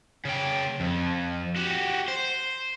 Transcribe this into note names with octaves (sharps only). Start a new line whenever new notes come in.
C#3 G5
F2
F#4 G4
C5